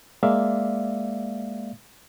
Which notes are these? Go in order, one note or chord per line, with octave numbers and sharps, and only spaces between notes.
G#3 A#3 D5 E5 F5